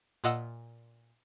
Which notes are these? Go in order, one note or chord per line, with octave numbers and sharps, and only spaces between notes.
A#2 F4 D#5 F#5 E6